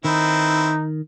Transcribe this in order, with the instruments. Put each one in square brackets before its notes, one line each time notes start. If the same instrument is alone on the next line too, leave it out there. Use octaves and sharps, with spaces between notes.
[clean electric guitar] D#3 [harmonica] C4 E4 B4 [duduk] D#4